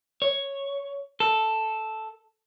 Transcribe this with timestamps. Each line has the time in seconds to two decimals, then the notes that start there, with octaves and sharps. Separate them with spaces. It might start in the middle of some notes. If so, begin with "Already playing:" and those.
0.22 C#5
1.20 A4